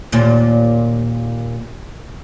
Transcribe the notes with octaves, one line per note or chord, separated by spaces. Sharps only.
D#2 A#2